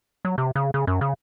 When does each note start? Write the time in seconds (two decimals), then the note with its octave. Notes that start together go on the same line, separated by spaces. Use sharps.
0.25 F#3
0.38 C3
0.56 C#3
0.74 C#3
0.87 F#2
1.01 C#3